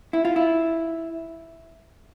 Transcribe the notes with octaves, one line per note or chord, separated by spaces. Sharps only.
E4
F4
E4